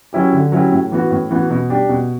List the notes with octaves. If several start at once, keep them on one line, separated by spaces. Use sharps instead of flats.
F#3 C#4 E4 G4
D3
F#3 C#4 E4 G4
A2
E3 B3 F#4
A2
E3 B3 F#4
B2
G3 D4 G4
B2